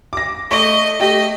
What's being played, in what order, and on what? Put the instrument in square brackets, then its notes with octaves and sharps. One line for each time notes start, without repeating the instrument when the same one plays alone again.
[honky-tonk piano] D6 A#6
[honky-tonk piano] A3 C#6 [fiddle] D#5
[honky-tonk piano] A3 G4 [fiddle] D#5